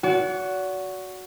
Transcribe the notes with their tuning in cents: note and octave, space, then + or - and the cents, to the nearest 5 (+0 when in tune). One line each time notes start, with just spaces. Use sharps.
F#4 +0 D5 -45